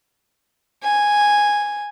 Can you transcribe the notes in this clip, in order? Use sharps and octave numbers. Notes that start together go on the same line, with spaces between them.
G#5